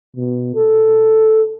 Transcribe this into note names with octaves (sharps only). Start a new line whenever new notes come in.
B2
A4